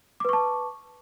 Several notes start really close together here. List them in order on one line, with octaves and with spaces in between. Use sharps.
D6 B4 C#6 A5